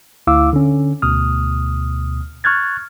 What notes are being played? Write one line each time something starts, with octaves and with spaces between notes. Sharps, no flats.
D2 E4 F5 D6 E6
D3 C#4
D2 B2 D#6 F6
C#6 F6 F#6 G#6 A6